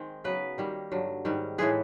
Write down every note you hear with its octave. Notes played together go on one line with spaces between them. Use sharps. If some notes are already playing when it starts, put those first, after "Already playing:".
Already playing: D#3 G#3 C4
C#3 F#3 B3 B4
D#3 G3 A#3
G2 D3 F#3
G#2 D#3 G3
A2 E3 G#3 B3 G#4